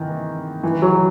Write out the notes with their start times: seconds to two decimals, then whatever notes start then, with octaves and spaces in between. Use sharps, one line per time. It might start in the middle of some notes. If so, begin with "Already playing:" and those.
Already playing: D#3 E3
0.63 E3
0.82 F#3